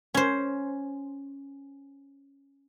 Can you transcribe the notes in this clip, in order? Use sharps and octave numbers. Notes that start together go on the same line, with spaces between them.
C#4 C5